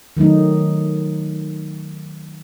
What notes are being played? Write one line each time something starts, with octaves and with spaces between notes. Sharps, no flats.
D#3 F#3 A3 D#4